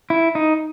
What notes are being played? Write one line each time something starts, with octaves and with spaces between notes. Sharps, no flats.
E4
D#4